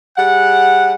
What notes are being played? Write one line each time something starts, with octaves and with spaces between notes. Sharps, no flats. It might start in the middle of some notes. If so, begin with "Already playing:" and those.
G3 G#4 F#5